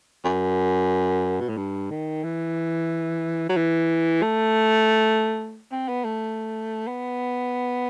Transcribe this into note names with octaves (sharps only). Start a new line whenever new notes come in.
F#2
B2
A2
G2
D#3
E3
F#3
E3
A3
C4
B3
A3
B3